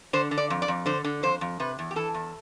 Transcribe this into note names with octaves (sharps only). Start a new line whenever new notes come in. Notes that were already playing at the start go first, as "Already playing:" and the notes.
D3 C5
D3
D5
F2
D5
F2
D3 C5
D3
F2 C5
F2
C3 B4
E2
G4
E3 A4
E2